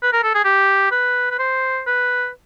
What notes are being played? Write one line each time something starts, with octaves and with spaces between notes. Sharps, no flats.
B4
A#4
A4
G#4
G4
B4
B4
C5
B4